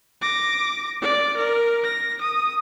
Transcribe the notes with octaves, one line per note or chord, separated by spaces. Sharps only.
D6 A#6
D5
A#4
A#6
D#6